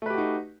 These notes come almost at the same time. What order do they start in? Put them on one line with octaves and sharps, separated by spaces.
A3 B4 G4 F#4 D#4